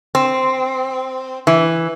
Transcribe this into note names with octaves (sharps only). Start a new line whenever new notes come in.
C4
E3